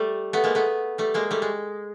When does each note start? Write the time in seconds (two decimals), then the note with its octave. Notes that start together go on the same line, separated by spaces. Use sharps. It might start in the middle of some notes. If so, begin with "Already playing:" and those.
Already playing: G3 A3
0.33 A3 B3
0.44 G#3 A#3
0.55 A3 B3
0.98 G3 A3
1.14 G#3 A#3
1.31 G3 A3
1.42 G#3